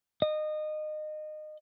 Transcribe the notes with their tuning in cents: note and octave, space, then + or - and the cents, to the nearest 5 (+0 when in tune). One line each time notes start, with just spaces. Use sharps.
D#5 -25